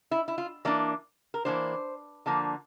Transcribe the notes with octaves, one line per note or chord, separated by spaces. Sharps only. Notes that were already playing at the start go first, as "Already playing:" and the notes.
E4
E4
F4
E3 A#3 D4 D5
A#4
E3 A#3 D4 C5
D3 F3 A#3